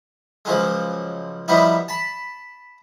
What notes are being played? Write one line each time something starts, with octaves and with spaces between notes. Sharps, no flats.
C#2 F3 F#3 G#3
F3 G3 B3 D#4 E4
A5 B5